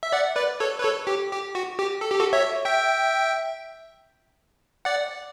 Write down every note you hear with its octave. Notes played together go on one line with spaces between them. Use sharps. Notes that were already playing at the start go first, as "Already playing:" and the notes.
E5
D5 F#5
B4 D5
A4 C#5
B4
A4 C#5
G4
G4
F#4
G4
A4
G4
F#4 A4
C#5 E5
E5 G5
D5 F#5